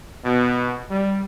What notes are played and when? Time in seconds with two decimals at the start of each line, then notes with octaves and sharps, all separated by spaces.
0.25 B2
0.90 G3